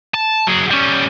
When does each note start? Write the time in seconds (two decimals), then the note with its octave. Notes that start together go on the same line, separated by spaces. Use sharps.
0.14 A5
0.47 F#3 G#4
0.71 G3 C#4